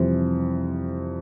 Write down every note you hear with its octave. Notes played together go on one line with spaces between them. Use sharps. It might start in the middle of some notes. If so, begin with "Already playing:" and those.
Already playing: F2 C3 E3 G3 C4